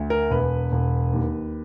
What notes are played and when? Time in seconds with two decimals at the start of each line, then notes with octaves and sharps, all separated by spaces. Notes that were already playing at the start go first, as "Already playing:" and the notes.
Already playing: D2
0.10 A#4
0.30 E1 B4
0.72 E1
1.13 D#2